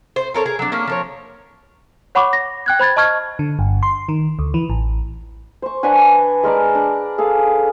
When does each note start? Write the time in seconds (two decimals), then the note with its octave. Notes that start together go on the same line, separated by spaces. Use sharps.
0.16 C5
0.34 A4 A#4 C#5
0.46 G#4 A#4
0.59 F#3 D4
0.72 A#3 C#4 D4
0.87 F3 A#4 C#5
2.15 C#5 F#5 B5 C#6 D6
2.33 A#6
2.66 G5 F#6 G#6
2.79 C5 B5 G#6 A6
2.96 D#5 A5 C#6 F6 G#6
3.39 D3
3.59 G1
3.83 C6
4.09 D#3
4.39 D2
4.54 E3
4.70 A1
5.62 C5 C#6
5.83 D4 B4 F#5 G#5
6.43 G#3 A#4 D5 A5
6.75 D4
7.18 G#4 A4 F5